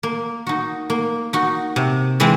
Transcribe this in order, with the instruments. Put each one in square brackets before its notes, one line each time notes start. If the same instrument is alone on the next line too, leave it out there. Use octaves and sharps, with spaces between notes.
[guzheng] A#3
D#4 F#4
A#3
D#4 F#4
C3
E3 G#3 C4